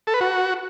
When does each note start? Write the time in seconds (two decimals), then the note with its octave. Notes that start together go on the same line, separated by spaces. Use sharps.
0.07 A4
0.14 B4
0.21 F#4